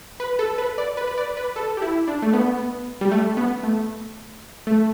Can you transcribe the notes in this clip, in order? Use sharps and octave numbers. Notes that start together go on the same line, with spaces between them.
B4
A4
B4
D5
B4
B4
D5
B4
A4
G4
E4
D4
A3
B3
G3
A3
B3
A3
A3